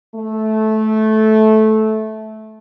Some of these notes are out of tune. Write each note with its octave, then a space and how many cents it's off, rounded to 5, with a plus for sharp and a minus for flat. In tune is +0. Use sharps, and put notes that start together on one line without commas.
A3 -15